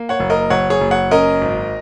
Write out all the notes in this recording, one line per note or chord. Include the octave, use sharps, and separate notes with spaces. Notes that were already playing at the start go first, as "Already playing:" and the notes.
Already playing: A#3
C#5 F#5
F#1
A#4 D#5
F#1 C#5 F#5
G#4 C#5
F#1
C#5 F#5
C#4 A#4 D#5
G#1